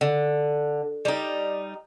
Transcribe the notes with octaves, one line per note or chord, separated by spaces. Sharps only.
D3
G3 D#4